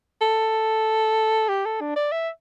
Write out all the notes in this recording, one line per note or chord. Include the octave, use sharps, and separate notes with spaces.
A4
G4
A4
D4
D5
E5